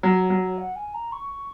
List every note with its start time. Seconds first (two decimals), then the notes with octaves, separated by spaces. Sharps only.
0.03 F#3 C#5
0.30 F#3
0.58 F#5
0.76 G#5
0.94 A#5
1.12 C#6